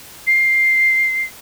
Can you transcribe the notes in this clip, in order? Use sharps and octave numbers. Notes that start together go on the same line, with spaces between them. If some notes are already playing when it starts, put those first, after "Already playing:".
C7